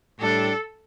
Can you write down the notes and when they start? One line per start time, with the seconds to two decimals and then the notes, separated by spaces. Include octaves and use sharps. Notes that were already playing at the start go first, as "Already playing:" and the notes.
0.20 A2 G3 D4 A4